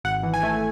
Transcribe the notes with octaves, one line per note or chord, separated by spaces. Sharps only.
G#1 F#5
E3
G#5
A3